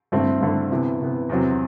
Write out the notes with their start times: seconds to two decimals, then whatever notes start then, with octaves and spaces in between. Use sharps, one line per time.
0.12 G2 D3 A3 C4 E4
0.41 G2 D3 A3 C4 E4
0.70 C3 E3 B3
1.00 C3 E3 B3
1.29 E2 C3 F#3 C4